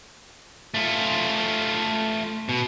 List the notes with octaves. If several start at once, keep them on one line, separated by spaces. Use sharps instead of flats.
A3 F4
B2